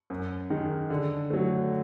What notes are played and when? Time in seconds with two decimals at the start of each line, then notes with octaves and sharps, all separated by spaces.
0.10 F#2
0.50 D#3 G#3
0.90 D3
1.30 F#3 A3